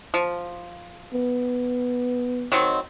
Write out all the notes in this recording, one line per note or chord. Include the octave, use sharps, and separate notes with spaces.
F3
B3
D#3 F#3 C4